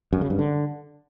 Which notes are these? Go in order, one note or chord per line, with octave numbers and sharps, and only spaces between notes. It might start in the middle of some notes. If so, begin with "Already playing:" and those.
F#2
C#3
G2
D3